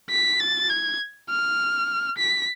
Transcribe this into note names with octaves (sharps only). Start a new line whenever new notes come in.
B6
A6
G#6
F6
B6